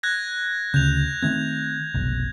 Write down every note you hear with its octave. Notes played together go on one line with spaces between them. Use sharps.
F#6 G#6 A#6
D2 C#3 G6 F7
D#3 A3 C4 G#6
F1 B1